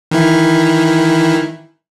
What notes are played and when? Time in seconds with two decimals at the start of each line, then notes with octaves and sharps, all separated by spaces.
0.11 D#3 E3 E4